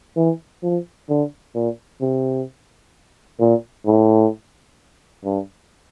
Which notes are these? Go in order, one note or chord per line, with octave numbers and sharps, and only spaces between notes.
E3
F3
D3
A#2
C3
A#2
A2
G2